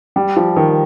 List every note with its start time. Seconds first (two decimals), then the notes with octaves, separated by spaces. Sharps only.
0.16 G3
0.36 F3
0.56 D#3